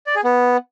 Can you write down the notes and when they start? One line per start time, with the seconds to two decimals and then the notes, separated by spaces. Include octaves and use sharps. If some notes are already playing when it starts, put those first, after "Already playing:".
0.07 D5
0.15 G#4
0.24 B3